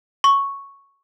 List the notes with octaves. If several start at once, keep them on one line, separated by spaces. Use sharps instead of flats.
C#6